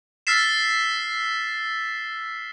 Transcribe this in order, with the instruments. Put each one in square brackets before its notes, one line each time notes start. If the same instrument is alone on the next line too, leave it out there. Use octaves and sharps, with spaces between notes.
[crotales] E6 F6 A6 B6 C7 E7